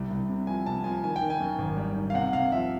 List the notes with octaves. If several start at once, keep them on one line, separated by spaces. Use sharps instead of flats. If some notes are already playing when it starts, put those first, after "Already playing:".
Already playing: C2 G3
C2
C3
F3 G#5
C3 A5
F3 G#5
D#3 G#5
G5
D#3
G#5
F#2
G#1
G3
D#3
F5
C3 F#5
C3 F5
F3 E5